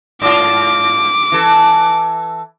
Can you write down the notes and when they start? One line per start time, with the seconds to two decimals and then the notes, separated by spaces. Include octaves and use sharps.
0.22 G#2 F4 D6
1.32 E3 A4